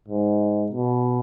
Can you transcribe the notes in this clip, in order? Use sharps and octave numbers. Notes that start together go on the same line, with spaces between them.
G#2
B2